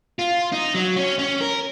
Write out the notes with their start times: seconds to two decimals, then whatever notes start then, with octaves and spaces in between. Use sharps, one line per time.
0.19 F4
0.52 D#4
0.74 F#3
0.96 C#4
1.19 C#4
1.41 A#4